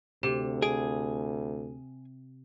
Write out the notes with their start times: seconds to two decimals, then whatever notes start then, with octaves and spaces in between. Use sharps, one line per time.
0.23 D2 C3 G4
0.62 G#4 D7